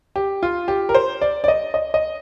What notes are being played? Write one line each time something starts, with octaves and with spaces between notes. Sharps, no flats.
G4
F4
G4
A#4
C5
D5
D5
D#5
D#5
D#5